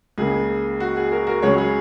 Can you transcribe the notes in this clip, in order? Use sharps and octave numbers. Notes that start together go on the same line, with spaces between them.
C#2 C#3 A#3 G#4
F#4
G#4
F#4 A#4
F#4 A#4
C#2 C#3 F#3 C#4 G#4 C#5
G#4